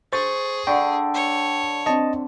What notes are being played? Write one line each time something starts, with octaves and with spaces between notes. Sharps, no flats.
G#4 C5 C#6 A6
D3 G5 C#6
C#5
C4 D4 D#5 A5